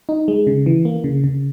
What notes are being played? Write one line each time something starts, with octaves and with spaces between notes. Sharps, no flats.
D#4
G#3
C#3
E3
A#3
C#3
C#3